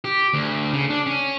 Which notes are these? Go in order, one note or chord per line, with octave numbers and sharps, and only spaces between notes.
G4
D2
C#3
D4
C#4